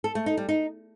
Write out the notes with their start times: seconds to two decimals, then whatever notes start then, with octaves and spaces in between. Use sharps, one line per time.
0.04 A4
0.15 A3
0.26 D#4
0.37 G3
0.49 D#4